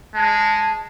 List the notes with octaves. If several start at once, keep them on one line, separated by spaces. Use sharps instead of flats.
G#3 A5